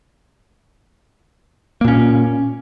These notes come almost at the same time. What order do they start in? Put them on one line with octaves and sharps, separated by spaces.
A#3 A#2 C#4